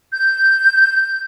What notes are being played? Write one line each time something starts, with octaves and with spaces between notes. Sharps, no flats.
G6